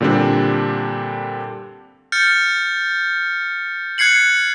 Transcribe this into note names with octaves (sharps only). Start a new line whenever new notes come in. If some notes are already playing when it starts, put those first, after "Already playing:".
A#2 D3 G3 C4 D4
F6 G6 A6 C#7
F#6 G#6 C7 C#7 F#7